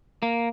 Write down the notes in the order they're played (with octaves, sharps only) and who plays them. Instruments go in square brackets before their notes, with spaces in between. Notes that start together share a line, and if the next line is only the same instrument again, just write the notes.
[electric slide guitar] A#3